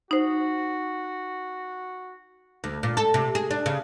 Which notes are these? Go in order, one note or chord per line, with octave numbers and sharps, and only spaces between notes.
D#4 F#4 C5
D2
A#2
A4
C3
G#4
D4
C#3